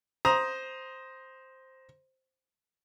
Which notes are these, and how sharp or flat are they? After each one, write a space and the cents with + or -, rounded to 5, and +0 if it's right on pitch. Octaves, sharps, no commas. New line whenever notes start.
C5 +0 A#5 +15 D#6 +0